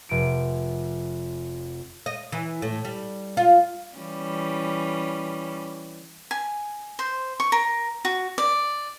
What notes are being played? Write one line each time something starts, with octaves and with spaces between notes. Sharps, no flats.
F1 D7
D#5
E3
A2
G3
F4
E3 G3 C#4
G#5
C5
C#6
A#4
F#4
D5